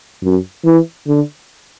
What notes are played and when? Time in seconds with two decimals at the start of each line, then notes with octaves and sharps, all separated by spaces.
0.24 F#2
0.65 E3
1.07 D3